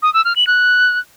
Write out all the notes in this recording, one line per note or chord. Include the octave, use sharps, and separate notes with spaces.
D#6
E6
F6
F#7
F#6